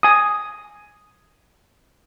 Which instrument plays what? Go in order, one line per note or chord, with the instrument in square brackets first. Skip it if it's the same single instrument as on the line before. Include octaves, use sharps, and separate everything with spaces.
[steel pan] G#5 D#6